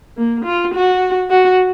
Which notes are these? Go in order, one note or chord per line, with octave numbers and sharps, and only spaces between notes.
A#3
F4
F#4
F#4